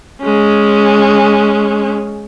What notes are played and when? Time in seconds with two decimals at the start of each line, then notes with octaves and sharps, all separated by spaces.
0.22 G#3 C#4